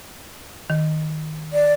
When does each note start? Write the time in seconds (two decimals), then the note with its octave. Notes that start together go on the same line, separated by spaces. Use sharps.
0.70 D#3
1.53 D5